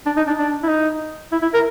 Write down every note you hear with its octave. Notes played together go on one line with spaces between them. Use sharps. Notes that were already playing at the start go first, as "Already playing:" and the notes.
D4
D#4
D4
D4
E4
D#4
E4
E4
A#4